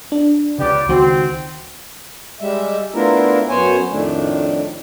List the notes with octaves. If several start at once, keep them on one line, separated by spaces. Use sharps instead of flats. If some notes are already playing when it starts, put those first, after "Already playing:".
D4
C#2 C#3 B3 G4 D5
C#2 D#3 C4 F#4
G3 G#3 E5
A3 B3 D4 E4 F4 A#4
F#2 B3 C5 C#5 G#5
F2 A2 D#3 A3 D4